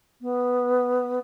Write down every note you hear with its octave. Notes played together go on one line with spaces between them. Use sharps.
B3